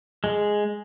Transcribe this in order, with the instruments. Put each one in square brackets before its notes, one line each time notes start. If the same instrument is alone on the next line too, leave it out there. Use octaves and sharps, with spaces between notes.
[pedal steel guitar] G#3